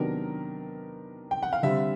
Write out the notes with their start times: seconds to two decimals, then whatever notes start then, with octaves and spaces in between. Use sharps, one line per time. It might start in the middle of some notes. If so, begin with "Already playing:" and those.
Already playing: C3 D#3 F#3 B3 D4 A#4
1.31 G5
1.43 F#5
1.53 F5
1.63 D3 G3 C4 E5